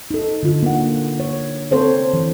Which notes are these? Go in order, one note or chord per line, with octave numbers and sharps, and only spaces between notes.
D#4 A4
D3 D#4 F4
A#3 F#5
C#5
C4 A4 C5 C#5
E3